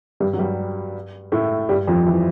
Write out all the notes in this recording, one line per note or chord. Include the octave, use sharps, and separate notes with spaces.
G2 G3
F#3
G2 G3
A2 A3
G2 G3
F2 F3
E3